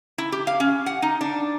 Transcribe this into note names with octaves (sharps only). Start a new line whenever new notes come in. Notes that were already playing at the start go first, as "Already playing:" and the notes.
E4
G4
F5
C#4
F#5
D#4
D4